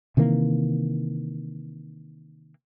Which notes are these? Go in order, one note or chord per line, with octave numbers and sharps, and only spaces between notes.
C3 D#3 E3 A#3